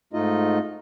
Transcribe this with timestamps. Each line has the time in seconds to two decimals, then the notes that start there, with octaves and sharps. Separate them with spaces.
0.13 G#2 A3 D#4 F4 D#5